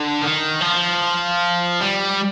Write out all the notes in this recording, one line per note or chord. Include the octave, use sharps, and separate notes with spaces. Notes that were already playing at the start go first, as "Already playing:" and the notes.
Already playing: D3
D#3
F3
G3